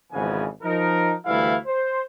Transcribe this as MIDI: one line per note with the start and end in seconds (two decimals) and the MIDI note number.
0.12 0.45 32
0.12 0.45 41
0.12 0.45 49
0.12 0.45 52
0.12 0.45 59
0.12 0.45 80
0.63 1.13 53
0.63 1.13 63
0.63 1.13 70
1.26 1.56 38
1.26 1.56 52
1.26 1.56 55
1.26 1.56 57
1.26 1.56 64
1.26 1.56 77
1.66 2.01 72